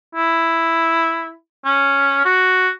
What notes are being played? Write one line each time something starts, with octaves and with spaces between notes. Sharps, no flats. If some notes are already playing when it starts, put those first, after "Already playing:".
E4
C#4
F#4